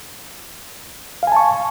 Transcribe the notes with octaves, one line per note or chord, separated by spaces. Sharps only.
F5 G#5 A5 C#6